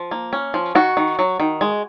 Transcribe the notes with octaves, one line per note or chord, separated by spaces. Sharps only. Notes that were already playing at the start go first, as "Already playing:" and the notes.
Already playing: F3
A#3
C#4
F3
D#3 F#4
D#3
F#3
D#3
G#3